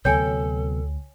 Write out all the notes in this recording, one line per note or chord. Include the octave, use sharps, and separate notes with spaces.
D2 C3 F#3 B3 A4 C#5 G5 G#5